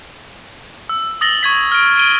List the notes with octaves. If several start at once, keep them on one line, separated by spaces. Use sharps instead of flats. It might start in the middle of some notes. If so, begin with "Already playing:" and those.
E6
D#6 E6 A6 A#6 F#7 G7
C#6 G#6 B6
F6 D7
D7 D#7 G7